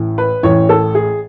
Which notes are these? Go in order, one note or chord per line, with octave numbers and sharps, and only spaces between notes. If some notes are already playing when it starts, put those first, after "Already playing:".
Already playing: A1 A2 E3
B4
A1 A2 E3 C#5
A4
G#4